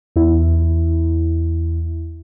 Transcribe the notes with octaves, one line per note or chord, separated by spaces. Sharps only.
E2 E4